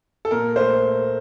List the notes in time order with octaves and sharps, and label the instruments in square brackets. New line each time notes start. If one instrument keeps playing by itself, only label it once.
[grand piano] A4
A#2 A#4
A3 C5